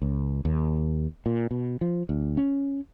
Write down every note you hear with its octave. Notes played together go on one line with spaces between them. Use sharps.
C#2
D#2
A#2
B2
F3
D2
C#4